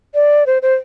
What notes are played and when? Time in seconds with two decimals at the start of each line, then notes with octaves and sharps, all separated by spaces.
0.14 D5
0.46 C5
0.62 C5